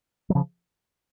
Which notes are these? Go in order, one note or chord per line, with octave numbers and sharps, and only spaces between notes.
F#3
C#3 F3